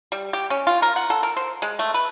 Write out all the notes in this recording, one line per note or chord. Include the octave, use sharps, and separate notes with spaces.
G3
G4
C#4
F4
A#4
F#5
A4
A#4
C5
G#3
A3
B4